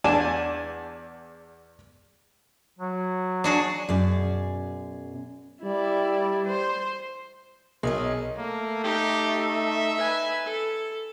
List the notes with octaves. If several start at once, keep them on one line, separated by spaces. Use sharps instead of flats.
E2 D4 G#5 A5
F#3
D4 F#4 G#4
F#2 B2 G#4 D5
G3 E4 D5
C5
B1 G#4 A#4 D#5
A3 A#3
D#4 G4
E5
B4 G#5
A4